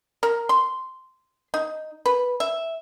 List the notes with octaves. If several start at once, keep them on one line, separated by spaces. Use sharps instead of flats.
A#4
C6
D#4
B4
E5